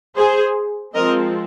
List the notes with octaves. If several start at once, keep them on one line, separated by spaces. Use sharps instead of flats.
G#4 C5
F3 G#3 C4 A#4 D#5